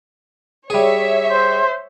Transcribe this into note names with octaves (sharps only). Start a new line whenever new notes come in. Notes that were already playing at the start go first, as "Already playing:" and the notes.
G3 G#4 C#5 E5
C5